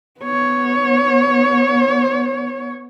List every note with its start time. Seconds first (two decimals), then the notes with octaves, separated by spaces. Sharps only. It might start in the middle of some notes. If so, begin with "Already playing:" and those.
0.21 B3 C#5